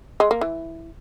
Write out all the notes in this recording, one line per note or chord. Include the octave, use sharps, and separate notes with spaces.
G#3
A#3
E3